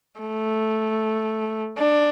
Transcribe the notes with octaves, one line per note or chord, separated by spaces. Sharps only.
A3
D4